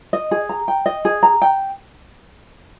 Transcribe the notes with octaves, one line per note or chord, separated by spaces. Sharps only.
D#5
G#4
A#5
G5
D#5
G#4
A#5
G5